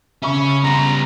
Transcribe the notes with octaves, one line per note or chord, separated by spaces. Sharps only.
C#3 C#4 E5 B5 C#6
G3 B3 A#5 C6